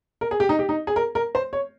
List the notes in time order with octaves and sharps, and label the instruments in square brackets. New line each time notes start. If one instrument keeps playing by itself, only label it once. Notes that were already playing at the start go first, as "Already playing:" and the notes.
[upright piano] A#4
G#4
G4
D#4
G4
D#4
G#4
A#4
A#4
C5
C#5